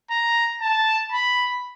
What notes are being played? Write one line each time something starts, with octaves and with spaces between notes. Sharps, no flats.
A#5
A5
B5